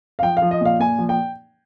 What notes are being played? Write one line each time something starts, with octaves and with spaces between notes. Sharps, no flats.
F5
F3 G5
F5
F3
D#5
A#2 F5
A#2 G#5
F3
G5